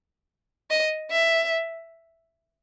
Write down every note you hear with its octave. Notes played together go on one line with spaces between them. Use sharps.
D#5
E5